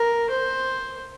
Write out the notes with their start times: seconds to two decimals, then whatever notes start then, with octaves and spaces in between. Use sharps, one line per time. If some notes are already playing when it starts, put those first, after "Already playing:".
Already playing: A#4
0.30 C5